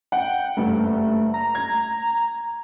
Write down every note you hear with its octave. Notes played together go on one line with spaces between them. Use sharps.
F#5 G5
F#1 G2 A3
A#5
G#6